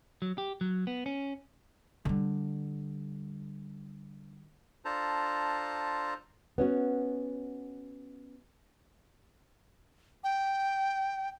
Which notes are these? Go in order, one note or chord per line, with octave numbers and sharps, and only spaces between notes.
F#3
G4
F#3
B3
C#4
D3 G3
D4 F4 A4 C5 A5 A#5
B3 C#4 F#4
G5